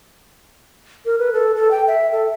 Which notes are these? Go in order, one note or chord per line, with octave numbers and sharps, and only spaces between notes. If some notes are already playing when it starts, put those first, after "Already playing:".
A#4
B4
A4
A4
G5
E5
A4